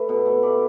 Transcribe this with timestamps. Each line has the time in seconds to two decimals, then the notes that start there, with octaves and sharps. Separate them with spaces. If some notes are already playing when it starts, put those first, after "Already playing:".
Already playing: A3 B4
0.09 B2
0.26 A3
0.43 A3 D5